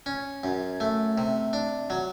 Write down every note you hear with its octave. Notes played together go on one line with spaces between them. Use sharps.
C#4
F#2
A3
C3
D4
F#3